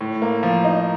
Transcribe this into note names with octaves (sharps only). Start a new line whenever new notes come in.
A2
A#3
F3
D#4